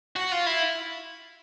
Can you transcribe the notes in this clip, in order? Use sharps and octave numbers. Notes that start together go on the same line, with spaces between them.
F#4
F4
E4